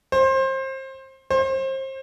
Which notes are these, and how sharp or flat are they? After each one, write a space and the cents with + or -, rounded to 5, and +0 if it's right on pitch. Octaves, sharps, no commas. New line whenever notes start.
C5 +25
C5 +30